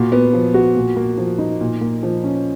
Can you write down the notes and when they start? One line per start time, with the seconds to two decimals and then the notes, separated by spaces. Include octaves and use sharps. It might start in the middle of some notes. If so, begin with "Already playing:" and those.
Already playing: A#2 F#4
0.12 B3
0.33 F3
0.54 F#4
0.76 A#2
0.96 A#3
1.17 F3
1.38 D#4
1.61 A#2
1.81 A#3
2.03 F3
2.24 C#4